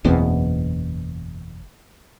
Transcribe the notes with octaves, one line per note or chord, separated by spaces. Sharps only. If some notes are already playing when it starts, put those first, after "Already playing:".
F#1 E2 B2 C4